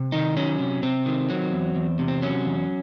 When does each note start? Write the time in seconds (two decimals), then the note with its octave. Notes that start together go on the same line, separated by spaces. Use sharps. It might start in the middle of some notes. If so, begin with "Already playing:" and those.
Already playing: C3
0.12 D#3 D#4
0.37 F#3 C#4
0.59 C3
0.83 C3 C4
1.06 D#3
1.30 F#3
1.52 E2
1.75 E2
1.99 C3
2.08 C4
2.22 F#3 C#4
2.45 E2